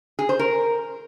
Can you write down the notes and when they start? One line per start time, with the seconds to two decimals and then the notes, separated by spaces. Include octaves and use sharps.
0.19 G#4
0.29 C5
0.39 A#4